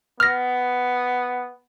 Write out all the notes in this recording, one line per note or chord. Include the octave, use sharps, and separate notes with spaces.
B3 F6 A#6